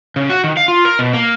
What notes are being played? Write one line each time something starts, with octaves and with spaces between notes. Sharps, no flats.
C#3
F#4
D#3
F5
F4
A#4
B2
A#3